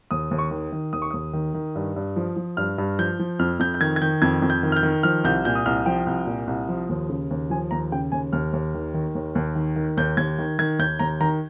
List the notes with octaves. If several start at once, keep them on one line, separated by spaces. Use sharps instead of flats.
D#2 D#6
D#2
C#6
D#3
D#3
D#2 D#6
C#6
D#2 D#6
D#3
D#3
G2
G2
F3
F3
G2 F6
G2
F3 G6
F3
F2 F6
F2 G6
G6
D#3 G#6
G#6
D#3 G6
F2 G#6
F2
G6
D#3
F6
G6
D#3
F3 F6
C2 G6
A#2 G6
D#6
C2 F6
F3 G5
C2
A#2
C2
F3
D#2
C#3
D#2
F3 G#5
D#2 A#5
C#3 G5
D#2 G#5
D#2 F6
D#2
D#3
D#3
D#2
D#2
D#3
D#3
D#2 G6
D#2 G#6
D#3
D#3 G#6
D#2 G6
D#2 A#5
D#3 A#5